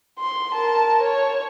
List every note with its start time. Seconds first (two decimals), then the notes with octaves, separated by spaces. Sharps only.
0.19 C6
0.54 A#4 A5
1.02 C#5